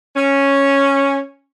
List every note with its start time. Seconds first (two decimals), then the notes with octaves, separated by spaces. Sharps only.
0.15 C#4